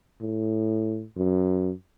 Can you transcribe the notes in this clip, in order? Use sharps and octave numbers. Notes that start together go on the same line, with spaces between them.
A2
F#2